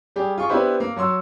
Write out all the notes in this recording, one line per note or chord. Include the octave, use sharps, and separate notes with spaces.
G3 G4 G#4
F4 G#4 C#6
B3 D4 E4 G4 B4 C5
A#3
F#3 F#4 C6 E6